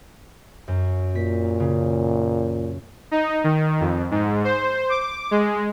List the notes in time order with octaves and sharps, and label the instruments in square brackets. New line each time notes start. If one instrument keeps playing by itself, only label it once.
[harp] F#2
[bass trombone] A#2 [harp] B6
[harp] C#3
[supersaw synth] D#4
D#3
F2
G#2
C5
D6
G#3